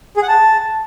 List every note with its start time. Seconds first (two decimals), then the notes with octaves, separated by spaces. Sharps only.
0.17 G#4
0.23 F#5
0.28 A5